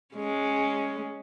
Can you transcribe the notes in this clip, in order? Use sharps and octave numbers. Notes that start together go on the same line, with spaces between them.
G#3 C#4